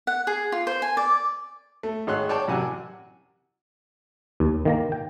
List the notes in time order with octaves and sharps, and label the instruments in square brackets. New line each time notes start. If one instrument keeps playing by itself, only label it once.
[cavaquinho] F#5
G#4
F4
C5
G#5
D5
[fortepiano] A3
G#1 G#3 C#5 C6 F#6
C#5 D5 G5 A5
A1 F#2 C3 F#4 F#5 G#5
[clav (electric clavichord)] D#2
D#3 A#3 A#5
G5